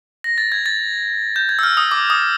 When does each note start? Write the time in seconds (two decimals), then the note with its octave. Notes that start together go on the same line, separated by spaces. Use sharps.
0.24 A#6
0.38 A6
0.52 G#6
0.66 A6
1.36 G6
1.49 G#6
1.59 E6
1.63 F6
1.77 D#6
1.91 D6
2.10 D#6